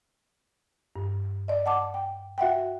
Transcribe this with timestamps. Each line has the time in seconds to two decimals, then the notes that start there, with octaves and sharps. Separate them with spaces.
0.96 G2
1.48 D5 D#5
1.66 F#5 A5 D6
1.94 G5
2.38 F#4 E5 F#5 G5